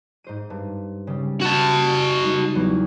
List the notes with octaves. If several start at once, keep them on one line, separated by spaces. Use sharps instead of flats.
G#2 C5 D#7
G2
C#3 G3
F#4 A5
G3 G#3 D#4
E2 F#3 B3